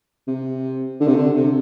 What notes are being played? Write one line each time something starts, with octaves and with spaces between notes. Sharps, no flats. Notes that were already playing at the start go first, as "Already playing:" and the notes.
C3
D3
C3
D3
C3